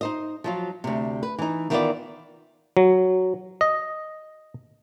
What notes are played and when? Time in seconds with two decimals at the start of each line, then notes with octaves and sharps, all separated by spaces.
0.01 D#4 C5 D#5
0.44 F3 F#3 F4
0.84 D2 C3
1.23 B4
1.39 E3 D#4
1.70 D#3 E3 B3 C4 F4 D5
2.77 F#3
3.61 D#5